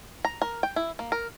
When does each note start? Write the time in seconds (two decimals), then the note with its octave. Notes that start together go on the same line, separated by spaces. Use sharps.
0.25 A#5
0.42 A#4
0.63 G5
0.76 E4
0.99 A#3
1.12 A#4